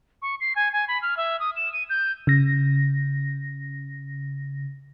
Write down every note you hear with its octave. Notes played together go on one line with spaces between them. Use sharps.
C#6
C7
G#5
G#5
B5
F6
E5
D#6
E7
D#7
G6
C#3 A#6